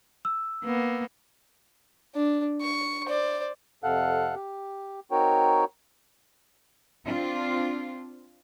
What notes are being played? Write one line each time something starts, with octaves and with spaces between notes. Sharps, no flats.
E6
A#3 B3
D4
C#6
C5 D5
F2 C3 A4 F5 F#5 F#6
G4
C4 D#4 F#4 A#4 C#5 G5
C4 D4 F4